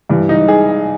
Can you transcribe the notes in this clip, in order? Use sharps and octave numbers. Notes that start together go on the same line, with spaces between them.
G2 E3
D#4
G#4